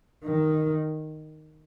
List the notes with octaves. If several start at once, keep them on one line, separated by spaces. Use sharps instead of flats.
D#3